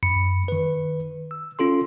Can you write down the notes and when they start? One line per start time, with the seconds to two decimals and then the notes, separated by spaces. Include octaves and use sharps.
0.03 F#2 B5 C#7
0.48 D#3 B4
1.31 E6
1.59 C#4 F4 A4 C6